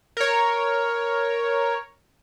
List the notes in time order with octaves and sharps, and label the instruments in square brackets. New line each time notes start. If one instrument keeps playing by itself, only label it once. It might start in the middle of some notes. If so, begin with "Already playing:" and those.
[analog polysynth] A#4 C#5